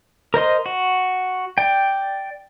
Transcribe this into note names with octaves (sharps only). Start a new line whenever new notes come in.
A#4 C5 D#5 C6
F#4
D5 G5